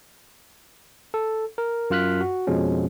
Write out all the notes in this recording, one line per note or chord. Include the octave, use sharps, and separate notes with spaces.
A4
A#4
F#2 F4 F6 F#6 B6
F#4
F2 B2 F3 G#3 C#4